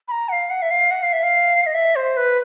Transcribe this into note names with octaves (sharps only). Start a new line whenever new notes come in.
B5
A#5
F#5
F5
F#5
E5
F5
F#5
F5
E5
F5
D#5
E5
C5
B4